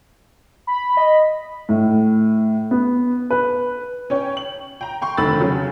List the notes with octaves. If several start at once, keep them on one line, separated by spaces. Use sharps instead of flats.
B5
D#5
A2
B3
B4
C#4 C#5 G5
F#7
G5 A#5
G5 C6 C#6
F1 D3 D#3 B5 E6 A6
C#3 F#3 C#4 F#4 G#4